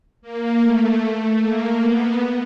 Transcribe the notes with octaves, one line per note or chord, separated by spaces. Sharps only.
A#3
A3
A3
A#3
B3